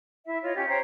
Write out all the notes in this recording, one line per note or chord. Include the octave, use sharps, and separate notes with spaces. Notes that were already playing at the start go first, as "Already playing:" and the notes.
E4 E5
F4 C#5 D#5
C#4 G4
C5 C#5 G5 A#5